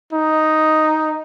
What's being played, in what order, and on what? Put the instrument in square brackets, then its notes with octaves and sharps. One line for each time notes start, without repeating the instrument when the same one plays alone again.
[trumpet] D#4